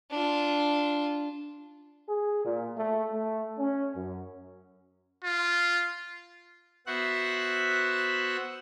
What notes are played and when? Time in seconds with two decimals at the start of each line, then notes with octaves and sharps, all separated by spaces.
0.11 D4 F4
2.08 G#4
2.45 A#2
2.76 A3
3.12 A3
3.59 C#4
3.96 F#2
5.24 F4
6.87 B3 F#4 C5 E5 F#5 F#6